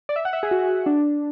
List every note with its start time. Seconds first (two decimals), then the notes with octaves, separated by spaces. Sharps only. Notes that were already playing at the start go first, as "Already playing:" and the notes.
0.09 D5
0.16 E5
0.25 F#5
0.33 E5
0.43 G#4
0.51 F#4
0.86 D4